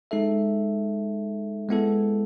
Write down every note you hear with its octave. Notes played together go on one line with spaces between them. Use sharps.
G#3 D#4 A4 E5
G#3 B3 E4 A4